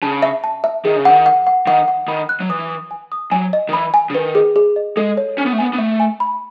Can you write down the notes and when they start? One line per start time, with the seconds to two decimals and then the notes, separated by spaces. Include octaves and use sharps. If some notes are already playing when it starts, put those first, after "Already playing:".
0.02 C#3 A5
0.23 E5
0.44 A5
0.64 E5
0.85 D#3 G#4
0.96 C#3
1.05 D#3 F#5
1.26 F#5
1.47 F#5
1.67 D#3 F#5
1.88 F#5
2.08 D#3 B5
2.29 F#6
2.40 F#3
2.49 E3 D#6
2.70 D#6
2.91 G#5
3.12 D#6
3.31 F#3 G#5
3.53 D#5
3.69 D#3
3.73 E3 B5
3.94 G#5
4.10 C#3
4.14 D#3 B4
4.35 G#4
4.56 G#4
4.76 D#5
4.97 G#3 A4
5.17 C#5
5.38 C#4 G#5
5.46 B3
5.53 A3
5.59 B3 G#5
5.73 B3
5.78 A3 E5
6.00 G#5
6.20 B5